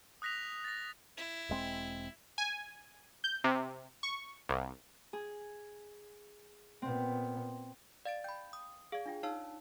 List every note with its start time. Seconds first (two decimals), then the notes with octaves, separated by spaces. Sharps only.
0.22 D#6 F#6 A#6 B6 F7
0.64 A6 A#6
1.17 E4
1.49 E1 G#3 C4
2.38 G#5
3.24 G6
3.44 C3
4.03 C#6
4.49 C2
5.13 G#4
6.82 A#2 B3 C4
8.05 D5 F5 A6 D7
8.24 G5 B5 G6
8.53 D#6
8.92 G#4 D5 F5
9.06 D4 F4 G5
9.23 D#4 C#5 F5 A5 E6